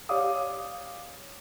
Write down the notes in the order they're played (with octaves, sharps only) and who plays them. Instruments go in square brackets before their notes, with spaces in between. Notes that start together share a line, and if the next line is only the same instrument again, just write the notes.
[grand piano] G4 C#5 D5 F5 D6 D#6